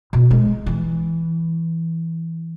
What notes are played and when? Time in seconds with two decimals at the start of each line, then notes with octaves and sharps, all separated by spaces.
0.13 B2
0.31 G#3
0.66 E3